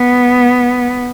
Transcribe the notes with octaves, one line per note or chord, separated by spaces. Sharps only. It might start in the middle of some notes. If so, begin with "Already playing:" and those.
Already playing: B3